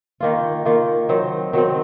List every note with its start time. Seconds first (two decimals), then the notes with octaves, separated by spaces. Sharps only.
0.20 D#3 A#3 F4
0.65 D#3 A#3 F4
1.09 D#3 F#3 C4
1.53 D#3 F#3 C4